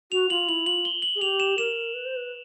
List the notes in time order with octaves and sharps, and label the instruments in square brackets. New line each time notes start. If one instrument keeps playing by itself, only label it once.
[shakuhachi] F#4 [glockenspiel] F7
[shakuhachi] F4 [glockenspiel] F#7
[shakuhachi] E4 [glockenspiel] F#7
[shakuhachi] F4 [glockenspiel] F#7
[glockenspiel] G7
F#7
[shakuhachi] G#4
[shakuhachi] G4 [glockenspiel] F7
[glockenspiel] E7
[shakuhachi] A#4 [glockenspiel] E7
[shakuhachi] B4
C5
B4